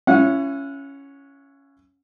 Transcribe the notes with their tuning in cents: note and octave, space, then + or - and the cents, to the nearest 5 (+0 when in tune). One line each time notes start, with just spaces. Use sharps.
C#4 +0 E4 +35 F#5 -30